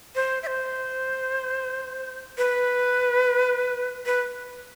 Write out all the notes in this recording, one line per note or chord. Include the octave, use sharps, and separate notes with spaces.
C5
E5
C5
B4
B4